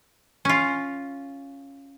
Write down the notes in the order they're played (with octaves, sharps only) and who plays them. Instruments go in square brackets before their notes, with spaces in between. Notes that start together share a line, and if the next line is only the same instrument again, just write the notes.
[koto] C#4 F4